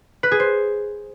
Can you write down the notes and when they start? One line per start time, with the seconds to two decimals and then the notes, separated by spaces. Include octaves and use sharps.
0.23 B4
0.31 G#4
0.40 C5